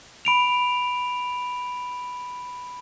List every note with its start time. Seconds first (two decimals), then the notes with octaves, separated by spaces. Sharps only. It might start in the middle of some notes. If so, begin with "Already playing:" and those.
0.25 B5 D7 F7